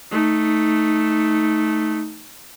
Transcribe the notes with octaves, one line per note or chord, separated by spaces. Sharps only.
A3 D#4